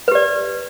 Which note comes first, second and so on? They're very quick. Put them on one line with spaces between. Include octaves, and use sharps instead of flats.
B4 G4 D5